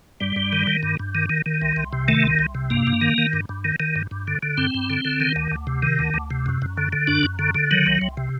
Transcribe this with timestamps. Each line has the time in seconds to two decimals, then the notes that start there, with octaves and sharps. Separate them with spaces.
0.20 G2 G3
0.36 G2
0.53 D#3
0.67 D#3
0.83 G2
0.99 G2
1.15 D#3
1.30 D#3
1.46 D#3
1.62 C2
1.76 C2
1.93 C3
2.08 D#3 A3
2.24 C2
2.39 C2
2.55 C3
2.70 G2 A#3
2.87 G2
3.01 D#3
3.18 D#3
3.33 G2
3.49 G2
3.65 D#3
3.80 D#3
3.96 G2
4.11 G2
4.27 D3
4.43 D3
4.58 G2 C4
4.74 G2
4.90 D3
5.05 D3
5.20 D#3
5.36 D2
5.52 D2
5.67 C3
5.83 D#3
5.99 D2
6.14 D2
6.30 C3
6.46 F#2
6.62 F#2
6.77 D3
6.93 D3
7.07 F#2 D4
7.23 F#2
7.39 D3
7.55 D3
7.71 D#3 F#3
7.86 C2
8.01 C2
8.17 C3